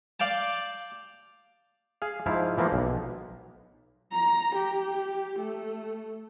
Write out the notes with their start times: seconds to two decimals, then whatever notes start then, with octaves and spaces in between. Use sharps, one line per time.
0.20 D5 F5 G5 A5
2.02 G#4 F5
2.26 G#2 F3 E4 F5
2.58 E3 F3 A#3 B3
2.72 B1
4.12 A#5
4.55 G4
5.39 A3